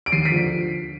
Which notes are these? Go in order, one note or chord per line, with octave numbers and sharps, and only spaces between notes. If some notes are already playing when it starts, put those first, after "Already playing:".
D7
D#2 C7 D#7
B6 D7
D3 F3